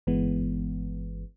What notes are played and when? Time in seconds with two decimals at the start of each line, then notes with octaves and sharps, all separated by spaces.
0.07 G1 E3 G#3 B3